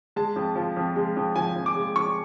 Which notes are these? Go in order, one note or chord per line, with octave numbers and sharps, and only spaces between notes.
G#3 A5
F2
F3
F2
G#3
F2
F3 G#5
F2
D6
G#3
F2 C#6